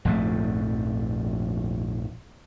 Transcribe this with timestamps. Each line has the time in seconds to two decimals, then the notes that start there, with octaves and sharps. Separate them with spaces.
0.05 A#1 F2 G#2 A3